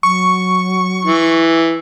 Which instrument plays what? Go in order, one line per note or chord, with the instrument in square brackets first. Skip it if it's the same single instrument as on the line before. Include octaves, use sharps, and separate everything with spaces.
[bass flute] F#3 [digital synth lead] C#6
[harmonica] E3